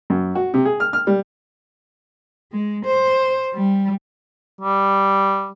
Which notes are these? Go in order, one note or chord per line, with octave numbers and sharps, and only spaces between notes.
F#2
F#4
C3
G#4
F6
F6
G3
G#3
C5
G3
G3